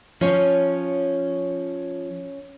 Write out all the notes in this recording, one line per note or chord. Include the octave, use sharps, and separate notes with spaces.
F3 C#4 C#5